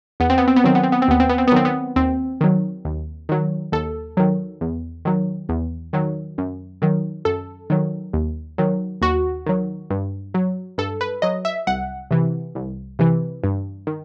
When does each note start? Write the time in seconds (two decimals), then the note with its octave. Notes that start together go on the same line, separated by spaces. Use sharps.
0.20 E2 B3
0.30 C4
0.38 B3
0.48 C4
0.56 B3
0.64 D#3 F#3 C4
0.75 B3
0.83 C4
0.92 B3
1.02 C4
1.08 D#2 B3
1.20 C4
1.29 B3
1.38 C4
1.47 B3
1.52 D#3 F#3 C4
1.65 B3
1.96 D#2 C4
2.41 D#3 F#3
2.85 D#2
3.29 D#3 F#3
3.72 D#2 A4
4.17 D#3 F#3
4.61 E2
5.05 D#3 F#3
5.49 E2
5.93 D#3 F#3
6.38 F#2
6.82 D#3 F#3
7.25 F#2 A4
7.70 D#3 F#3
8.13 D#2
8.58 D#3 F#3
9.02 D#2 F#4
9.46 D#3 F#3
9.90 G2
10.34 F#3
10.78 G2 A4
11.01 B4
11.22 F#3 D#5
11.45 E5
11.67 C2 F#5
12.11 C3 E3
12.55 C2
12.99 C3 E3
13.44 G2
13.87 D#3